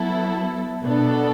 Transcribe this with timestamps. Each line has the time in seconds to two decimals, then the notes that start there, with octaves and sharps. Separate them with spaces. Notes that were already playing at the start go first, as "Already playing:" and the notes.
Already playing: F#3 B3 E4 A4
0.83 B2 B3 D4 A4